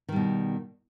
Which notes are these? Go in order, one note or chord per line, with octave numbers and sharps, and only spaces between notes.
B2 D#3 G3